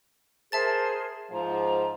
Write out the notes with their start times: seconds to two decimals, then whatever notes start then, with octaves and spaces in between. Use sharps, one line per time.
0.52 G#4 A#4 C5 E5 A5 A6
1.32 G#2 F3 A#5